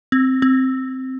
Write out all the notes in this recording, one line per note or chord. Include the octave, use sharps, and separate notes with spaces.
C4
C4